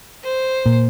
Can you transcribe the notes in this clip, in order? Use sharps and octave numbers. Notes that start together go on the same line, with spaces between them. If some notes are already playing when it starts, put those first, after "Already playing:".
C5
A#2